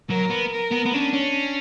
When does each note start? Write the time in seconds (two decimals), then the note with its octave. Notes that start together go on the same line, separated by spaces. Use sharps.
0.09 F#3 A#4
0.31 B3
0.52 A#4
0.72 B3
0.86 B3
0.93 C#4 D4
1.14 C#4